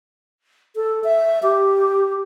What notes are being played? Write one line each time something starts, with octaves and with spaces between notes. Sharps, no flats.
A4
E5
G4